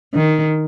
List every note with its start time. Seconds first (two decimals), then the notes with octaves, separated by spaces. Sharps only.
0.14 D#3